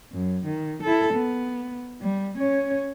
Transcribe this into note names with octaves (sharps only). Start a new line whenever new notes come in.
F#2
D#3
E4 A4
B3
G3
C#4 C#5